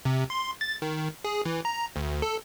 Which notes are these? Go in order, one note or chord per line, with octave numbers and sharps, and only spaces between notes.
C3
C6
A6
D#3
G#4
E3
A#5
D2
A4